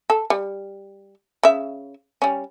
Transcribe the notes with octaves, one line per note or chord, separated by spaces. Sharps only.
A4
G3
C#3 E5
G3 C#4